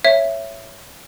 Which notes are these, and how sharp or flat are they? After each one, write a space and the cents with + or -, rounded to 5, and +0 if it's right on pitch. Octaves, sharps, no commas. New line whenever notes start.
C#5 +0 E5 +10